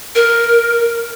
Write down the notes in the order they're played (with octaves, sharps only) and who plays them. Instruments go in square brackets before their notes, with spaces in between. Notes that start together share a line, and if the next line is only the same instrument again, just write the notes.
[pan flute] A#4